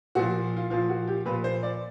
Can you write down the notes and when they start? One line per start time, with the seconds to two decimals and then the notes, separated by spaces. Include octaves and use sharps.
0.15 A#2 F3 F#4
0.57 F4
0.70 A#2 F3 F4
0.89 F#4
1.07 G4
1.26 A#2 F3 B4
1.44 C5
1.63 D5